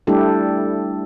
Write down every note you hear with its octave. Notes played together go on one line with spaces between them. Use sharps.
G3 A3 D4 E4 G4 A4